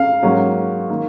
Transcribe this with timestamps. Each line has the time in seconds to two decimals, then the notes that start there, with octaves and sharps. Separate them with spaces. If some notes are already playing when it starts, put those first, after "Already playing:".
Already playing: F5
0.22 G#2 F#3 A#3 C#4
0.90 D#3 A#3